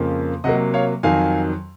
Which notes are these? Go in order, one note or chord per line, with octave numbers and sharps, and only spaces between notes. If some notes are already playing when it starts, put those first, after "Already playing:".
Already playing: F2 C#3 F3 A#3
C3 F#3 A#3 D#5 F#5
C#5 F5
F2 D#3 F#3 F5 G#5